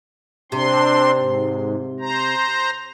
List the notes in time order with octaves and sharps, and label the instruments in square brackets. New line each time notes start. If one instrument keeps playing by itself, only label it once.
[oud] C3 [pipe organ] C4 D4 C6
[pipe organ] G#2
C5 A#5